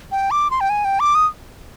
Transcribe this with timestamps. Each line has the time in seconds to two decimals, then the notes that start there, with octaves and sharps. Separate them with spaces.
0.12 G5
0.31 D6
0.51 C6
0.61 G5
0.70 G#5
0.85 G5
1.00 D6
1.15 D#6